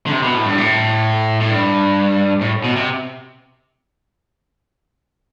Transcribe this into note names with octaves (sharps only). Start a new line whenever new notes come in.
D3
C3
B2
A2
G2
A2
A2
G2
A2
B2
C3